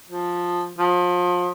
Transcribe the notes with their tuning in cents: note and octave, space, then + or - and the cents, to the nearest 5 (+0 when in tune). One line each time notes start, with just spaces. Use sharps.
F3 +10
F3 +30